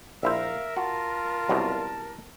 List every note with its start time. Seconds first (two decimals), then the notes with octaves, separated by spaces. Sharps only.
0.23 A#1 E4 A#4 C5 E5 F5
0.77 F4 F#4 A5
1.49 C2 F#2 B2